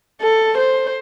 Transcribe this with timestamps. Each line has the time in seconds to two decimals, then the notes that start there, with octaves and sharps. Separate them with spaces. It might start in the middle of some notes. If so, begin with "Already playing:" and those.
0.21 A4
0.58 C5